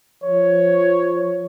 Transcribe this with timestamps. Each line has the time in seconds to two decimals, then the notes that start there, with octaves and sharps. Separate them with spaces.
0.24 F3 C#5